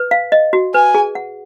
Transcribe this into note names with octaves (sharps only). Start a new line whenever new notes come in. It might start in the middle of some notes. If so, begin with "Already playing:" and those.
Already playing: B4
F5
D#5
F#4
B4 G#5
G#4
F#5